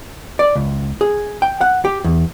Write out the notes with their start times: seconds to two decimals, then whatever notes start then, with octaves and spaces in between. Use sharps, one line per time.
0.39 D5
0.55 C#2
1.01 G#4
1.42 G5
1.61 F#5
1.85 G4
2.04 E2